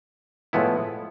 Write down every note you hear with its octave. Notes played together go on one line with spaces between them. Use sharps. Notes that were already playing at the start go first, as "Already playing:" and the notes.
A2 F3 G#3 B3 E4